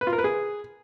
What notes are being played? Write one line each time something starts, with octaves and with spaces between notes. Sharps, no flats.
B4
F4
A#4
B4
G#4